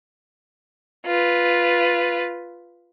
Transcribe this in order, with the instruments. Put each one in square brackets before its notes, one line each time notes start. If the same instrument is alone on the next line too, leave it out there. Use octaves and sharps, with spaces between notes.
[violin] F4 B4